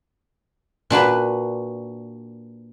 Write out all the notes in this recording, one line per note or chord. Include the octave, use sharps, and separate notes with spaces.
A#2 D4 F#4 B4